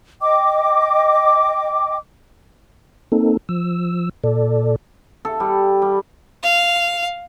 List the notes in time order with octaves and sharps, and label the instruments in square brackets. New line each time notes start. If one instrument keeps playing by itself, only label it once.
[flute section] D#5 G5 D6
[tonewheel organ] A#3 C4 D#4 A4
F3 E6
A#2 A4 D5
[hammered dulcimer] A4
G3
G3
[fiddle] F5